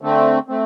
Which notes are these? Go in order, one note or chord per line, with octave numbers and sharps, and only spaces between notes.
D3 A3 C4
A3 C4